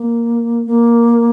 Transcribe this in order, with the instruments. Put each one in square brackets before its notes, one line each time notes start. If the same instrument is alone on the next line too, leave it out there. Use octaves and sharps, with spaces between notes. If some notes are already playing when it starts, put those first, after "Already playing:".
Already playing: [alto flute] A#3
A#3